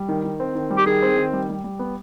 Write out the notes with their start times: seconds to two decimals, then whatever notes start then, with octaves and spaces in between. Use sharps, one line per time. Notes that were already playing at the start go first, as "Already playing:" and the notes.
Already playing: G3
0.09 D#3
0.24 D#3
0.40 C4
0.55 D#3
0.70 G3
0.77 G4
0.86 D#3 G#4
1.02 C4
1.17 D#3
1.33 G3
1.49 G3
1.64 G3
1.79 B3